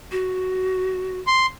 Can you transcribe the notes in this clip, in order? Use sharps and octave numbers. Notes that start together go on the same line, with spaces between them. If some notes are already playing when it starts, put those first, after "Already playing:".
F#4
C6